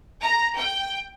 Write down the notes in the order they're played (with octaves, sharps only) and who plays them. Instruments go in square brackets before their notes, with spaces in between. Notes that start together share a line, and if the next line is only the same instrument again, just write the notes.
[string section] A#5
G5